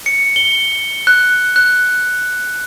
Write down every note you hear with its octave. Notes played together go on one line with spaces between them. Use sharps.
C#7
G7
F#6
F#6